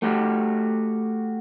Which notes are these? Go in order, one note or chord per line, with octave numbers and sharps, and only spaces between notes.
A3 F#4 G4